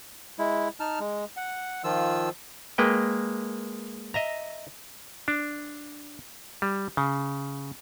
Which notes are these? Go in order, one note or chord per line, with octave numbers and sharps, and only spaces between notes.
G#3 E4
D#4 A5 F6
G#3
F#5
D#3 F3 F4 E6
G#3 A#3 B4 G5
D#5 E5 A#5
D4
G3
C#3